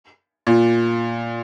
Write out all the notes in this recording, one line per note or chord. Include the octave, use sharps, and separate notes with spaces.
A#2